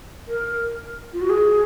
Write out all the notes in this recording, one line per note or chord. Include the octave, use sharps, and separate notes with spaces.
A#4
F4
F#4
G#4